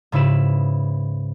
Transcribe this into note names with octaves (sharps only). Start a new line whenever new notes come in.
G#2 C#3 E4 B4 E7